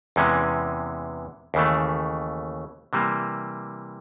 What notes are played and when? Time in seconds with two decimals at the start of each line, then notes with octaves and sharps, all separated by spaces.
0.16 E2 C3 E3 G#3 C#4
1.54 D#2 C#3 E3 A3
2.93 C3 E3 G3 A#3